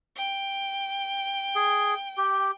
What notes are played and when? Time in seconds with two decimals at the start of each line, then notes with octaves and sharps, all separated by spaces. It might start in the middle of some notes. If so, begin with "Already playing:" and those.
0.16 G5
1.56 G#4
2.18 G4